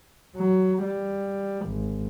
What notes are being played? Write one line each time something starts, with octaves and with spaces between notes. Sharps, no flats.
F#3
G3
G#1